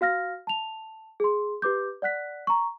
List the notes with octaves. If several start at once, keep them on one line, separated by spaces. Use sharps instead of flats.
F#4 F5 F6 A#6
A5 F7
G#4 C6
G4 B4 D6 G6
D5 F#5 F#6 B6
A#5 C#6